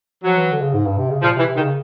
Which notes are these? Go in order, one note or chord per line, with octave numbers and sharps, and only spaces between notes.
F3 F#3
E3
D3
C#3
G#2
G2
C3
C#3
A#2 F3
C3
E3
C3
D#3
C#3